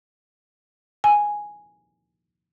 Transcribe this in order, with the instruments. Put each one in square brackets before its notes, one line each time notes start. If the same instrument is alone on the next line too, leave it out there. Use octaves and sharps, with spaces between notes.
[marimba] G#5